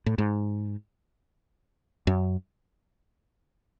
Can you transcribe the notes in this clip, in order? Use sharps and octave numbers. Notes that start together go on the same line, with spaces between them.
A2
G#2
F#2